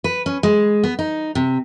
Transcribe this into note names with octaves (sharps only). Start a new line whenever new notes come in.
B4
C#4
G#3
B3
D#4
C3